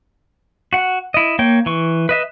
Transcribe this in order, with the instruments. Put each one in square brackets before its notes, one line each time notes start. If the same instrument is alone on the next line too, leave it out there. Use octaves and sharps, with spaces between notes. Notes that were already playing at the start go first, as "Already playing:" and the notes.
[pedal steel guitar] F#4 F#5
E4 D#5
A#3 C#5 G5
E3 C#6
B4 D#5 E5